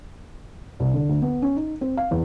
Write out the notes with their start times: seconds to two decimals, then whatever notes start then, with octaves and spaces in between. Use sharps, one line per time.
0.80 C2
0.94 D3
1.09 D2
1.22 B3
1.42 C#4
1.56 D#4
1.81 C4
1.97 F5
2.11 E2